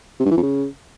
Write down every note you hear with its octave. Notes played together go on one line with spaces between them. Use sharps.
C3
G2
E3
F2
C#3